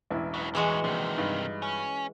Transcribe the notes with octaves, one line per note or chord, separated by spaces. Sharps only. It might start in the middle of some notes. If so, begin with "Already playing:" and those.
E1 A1 E4
F#3 B3
A2 E3 F#3 G#3 F#4
A#1 C3 D#3
G2 D#4
C#4